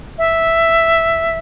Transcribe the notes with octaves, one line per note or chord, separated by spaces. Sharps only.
E5